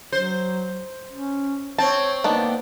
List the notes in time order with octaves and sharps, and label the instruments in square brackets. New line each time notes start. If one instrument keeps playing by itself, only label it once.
[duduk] F#3 [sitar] C5
[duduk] C#4
[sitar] C4 [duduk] C#5 [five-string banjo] A5
[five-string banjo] D#3 B3 D4 [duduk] A#3